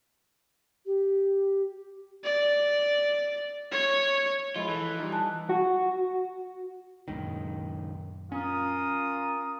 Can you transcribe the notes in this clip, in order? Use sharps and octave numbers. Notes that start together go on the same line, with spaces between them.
G4
D5
C#5
F3 G#3 E4 F4 D#5 B5
E3 A4
G3 D#4 F4
G#5 A5 F#6
F#4
C#2 F#2 A#2 D#3
C#4 F4 A#4 D#6